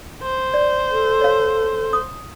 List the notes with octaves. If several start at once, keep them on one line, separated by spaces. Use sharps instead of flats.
C5
D5
A4
C#5 F5
D#6